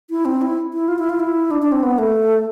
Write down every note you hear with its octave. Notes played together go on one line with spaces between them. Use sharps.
E4
C4
E4
E4
F4
E4
F4
E4
D4
D4
C4
B3
A3